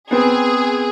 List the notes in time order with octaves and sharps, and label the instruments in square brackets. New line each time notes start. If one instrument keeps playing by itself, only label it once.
[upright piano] B3 C4 [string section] G#4